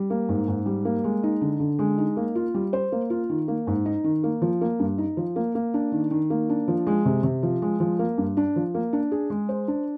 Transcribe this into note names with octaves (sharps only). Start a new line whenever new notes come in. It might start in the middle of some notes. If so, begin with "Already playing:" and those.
Already playing: G3
A#3
G#2
G#2
G3
A#3
G#3
D#4
D3
D3
G#3
D#4
A#3
F4
G3
C5
A#3
F4
D#3
A#3
G#2
D#4
D#3
A#3
F3
A#3
G2
D#4
F3
A#3
A#3
D4
D#3
D#3
A#3
D4
F3
G#3
C3
C3
F3
G#3
F3
A#3
G2
D4
F3
A#3
D4
G#4
G#3
C5
D4